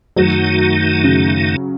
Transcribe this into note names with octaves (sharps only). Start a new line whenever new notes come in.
F#2 D#3 F#3 A3 D#4
C#3